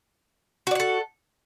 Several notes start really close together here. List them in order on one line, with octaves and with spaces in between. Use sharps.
F#4 D5 F#5 A4